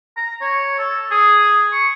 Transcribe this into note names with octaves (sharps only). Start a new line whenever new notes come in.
A#5
C#5
A4
G#4
C#6